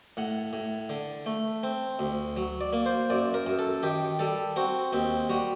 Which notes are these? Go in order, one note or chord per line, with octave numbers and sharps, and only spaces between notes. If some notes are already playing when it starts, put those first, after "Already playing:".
A2 F#5
A2
D3
A3
C4
D2
F#3
D5
A#3
C5
F#2 D5
A#4
F#2
A4
D#3 G4
G3 A4
C4 F#4
D#2 C4
G3 F#4